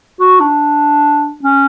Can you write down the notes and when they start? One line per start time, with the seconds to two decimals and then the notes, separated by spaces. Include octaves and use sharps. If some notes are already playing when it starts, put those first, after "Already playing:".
0.20 F#4
0.40 D4
1.43 C#4